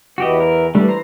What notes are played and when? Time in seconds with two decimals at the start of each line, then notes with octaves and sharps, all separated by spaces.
0.18 E2 E3 F#4 G4 D#5
0.40 A#4
0.75 E3 G3 A3 D4
0.88 C5 A#5